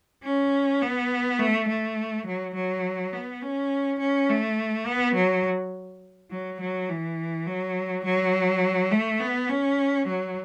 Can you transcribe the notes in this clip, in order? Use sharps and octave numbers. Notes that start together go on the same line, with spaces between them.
C#4
B3
A3
A3
F#3
F#3
B3
C#4
C#4
A3
B3
F#3
F#3
F#3
E3
F#3
F#3
A3
B3
C#4
F#3